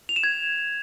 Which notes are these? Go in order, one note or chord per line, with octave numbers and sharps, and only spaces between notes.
F7
E7
G#6